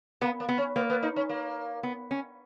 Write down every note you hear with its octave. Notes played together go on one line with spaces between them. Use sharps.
A#3 B3
A#3
B3
C#4
A#3 B3
B3
D#4
C#4
A#3
B3
C#4